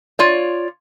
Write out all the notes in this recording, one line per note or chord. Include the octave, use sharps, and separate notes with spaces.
F4 C#5 D5